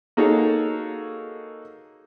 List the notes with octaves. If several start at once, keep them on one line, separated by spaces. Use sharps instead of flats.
A#3 D#4 F#4 G#4 A4 C#5